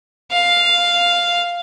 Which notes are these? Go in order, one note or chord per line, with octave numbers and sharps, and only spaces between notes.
F5